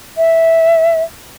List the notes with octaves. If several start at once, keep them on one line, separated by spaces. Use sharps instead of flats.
E5